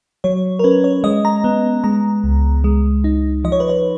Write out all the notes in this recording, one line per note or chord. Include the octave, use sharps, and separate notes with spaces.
F#3 C#5
A#4
C#4 B4
C#5
G#3 D#5
A#5
B3
G#3 A#5
C#2
G#3
D#4
F3 D#5
C#5
B4
C#5